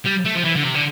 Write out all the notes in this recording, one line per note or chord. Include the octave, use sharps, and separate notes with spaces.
G3
A3
F3
E3
D3
C3
D3